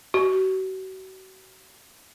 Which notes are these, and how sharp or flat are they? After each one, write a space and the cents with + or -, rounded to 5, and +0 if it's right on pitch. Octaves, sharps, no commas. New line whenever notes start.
F#4 +40